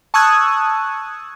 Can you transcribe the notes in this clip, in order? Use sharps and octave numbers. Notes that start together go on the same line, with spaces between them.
A5 C#6 D#6 E6 F#6 G#6